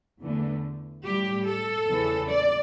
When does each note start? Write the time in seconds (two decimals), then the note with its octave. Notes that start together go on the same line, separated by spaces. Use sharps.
0.20 E2 D3 A3
1.04 A2 G3 G4
1.45 A4
1.87 E2 C#3 E3
2.29 D5